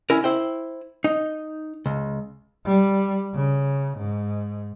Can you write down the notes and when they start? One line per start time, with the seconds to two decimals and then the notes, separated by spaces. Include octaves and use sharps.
0.10 C#4 E4 A#4
0.24 E4 C5 G5
1.04 D#4
1.86 C#2
2.65 G3
3.34 C#3
3.98 G#2